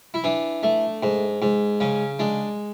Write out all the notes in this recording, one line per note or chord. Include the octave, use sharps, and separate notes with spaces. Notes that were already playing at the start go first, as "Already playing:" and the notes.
E4
E3 D4
A3
G#2
G#2
C#3 C#4
G#3 D4